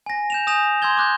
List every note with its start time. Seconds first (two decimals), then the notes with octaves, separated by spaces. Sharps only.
0.06 G#5 A#6
0.30 G6 E7 F7
0.47 G#5 D#6 G6 A#6 E7 F7
0.82 C6 E6 G6 G#6 G7
0.97 D6 F#6 G6